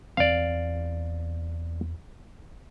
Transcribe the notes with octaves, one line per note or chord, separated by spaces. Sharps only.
E2 C4 D5 F5